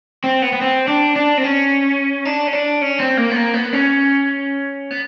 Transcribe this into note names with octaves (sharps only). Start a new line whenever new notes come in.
C4
B3
B3
C4
D4
D4
C4
C#4
D4
C#4
D4
C#4
C4
A#3
B3
A#3
B3
C#4
B3